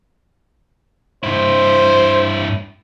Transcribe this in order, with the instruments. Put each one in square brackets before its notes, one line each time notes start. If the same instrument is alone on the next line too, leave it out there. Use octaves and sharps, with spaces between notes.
[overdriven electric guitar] G2 E4 [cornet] C5